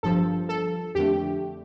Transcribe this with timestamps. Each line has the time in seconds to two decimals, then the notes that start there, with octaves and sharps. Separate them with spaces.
0.03 G1 G2 F3 A4
0.49 A4
0.95 F2 D3 A3 G4